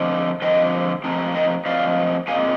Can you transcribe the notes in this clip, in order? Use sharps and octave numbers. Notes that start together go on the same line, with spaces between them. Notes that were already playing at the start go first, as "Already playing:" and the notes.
Already playing: D3 F3 C4 D#4
D3 F3 C4 D#4 D#5 G5
F3 C4 D#4
D#5 G5
F3 C4 D#4 D5 F5
A#2 G#3 C4 D#4 F5 G#5